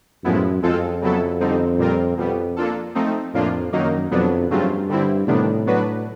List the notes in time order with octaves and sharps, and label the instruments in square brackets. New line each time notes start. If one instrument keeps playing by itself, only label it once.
[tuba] F#2 [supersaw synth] A2 F3 G#3 B3 E4
[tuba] F2 [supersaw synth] G#3 C4 F4 A4
[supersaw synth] C#3 F#3 B3 E4 A4
D3 G3 C4 D#4
A#2 G3 C4 F4 A#4
[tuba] F2 [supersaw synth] B2 G3 B3
[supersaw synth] A#3 D4 F4 A4
F3 A3 C4 D#4
[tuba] F2 [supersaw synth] A2 F3 A#3 D4 F4
[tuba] F#2 [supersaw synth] D#3 F#3 A#3 D#4
[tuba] F2 [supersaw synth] B2 F#3 B3 D4
[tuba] G2 [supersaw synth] C#3 F#3 A3 C4 F4
[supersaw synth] D3 G3 C4 E4
[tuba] A2 [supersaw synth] C3 D#3 G3 B3 D4
[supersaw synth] F#3 B3 D4 F#4 B4